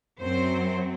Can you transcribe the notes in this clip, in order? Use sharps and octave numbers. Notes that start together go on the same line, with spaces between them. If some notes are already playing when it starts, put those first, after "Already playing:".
F#2 F#3 C4 C5